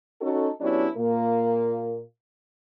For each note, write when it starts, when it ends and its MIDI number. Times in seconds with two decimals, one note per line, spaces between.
0.21 0.49 61
0.21 0.49 63
0.21 0.49 66
0.21 0.49 69
0.60 0.87 54
0.60 0.87 59
0.60 0.87 61
0.60 0.87 62
0.60 0.87 64
0.60 0.87 67
0.97 2.01 46
0.97 2.01 58